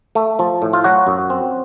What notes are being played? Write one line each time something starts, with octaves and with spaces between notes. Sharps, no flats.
A3
F3
A2
F4
F#3 F#4
F#2
C4